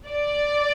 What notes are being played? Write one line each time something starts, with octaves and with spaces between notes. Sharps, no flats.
D5